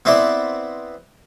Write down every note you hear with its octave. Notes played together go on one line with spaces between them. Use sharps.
B3 C4 E4 D5